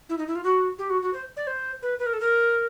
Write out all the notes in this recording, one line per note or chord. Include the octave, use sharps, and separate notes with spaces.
E4
D#4
E4
F4
F#4
G4
F#4
F#4
C5
D5
C5
B4
B4
A#4
A4
A#4